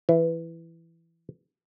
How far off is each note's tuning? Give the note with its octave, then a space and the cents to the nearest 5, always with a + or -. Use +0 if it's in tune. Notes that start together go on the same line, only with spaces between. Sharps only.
E3 +10